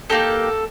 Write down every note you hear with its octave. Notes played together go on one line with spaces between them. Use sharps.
A#3 D#4 G4 A4